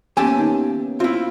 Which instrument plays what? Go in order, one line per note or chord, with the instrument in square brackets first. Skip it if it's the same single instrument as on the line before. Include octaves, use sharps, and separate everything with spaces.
[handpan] A#3 B3 C#4 [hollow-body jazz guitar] G4 E5 A5 [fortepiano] G#5
[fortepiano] D#3
[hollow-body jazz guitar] C4 E4 [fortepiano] F4